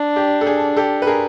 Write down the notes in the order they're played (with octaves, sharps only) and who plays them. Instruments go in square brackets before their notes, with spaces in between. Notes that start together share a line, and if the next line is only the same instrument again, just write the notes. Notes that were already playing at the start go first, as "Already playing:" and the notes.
Already playing: [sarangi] D4
[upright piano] G4
A4
G#4
G4 A4
B4
G#4 A#4